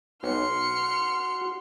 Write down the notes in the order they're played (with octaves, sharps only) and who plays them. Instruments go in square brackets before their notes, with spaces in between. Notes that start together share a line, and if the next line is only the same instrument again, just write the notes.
[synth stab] B1 [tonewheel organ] F#4 [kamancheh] C6 [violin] F6 C#7